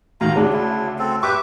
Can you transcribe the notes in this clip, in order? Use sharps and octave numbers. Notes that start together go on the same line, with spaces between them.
D2 D#3 F5 A#5
D2 C#3 D4
D4 E4
C4 A4
G4 B4 E5 C#6 D6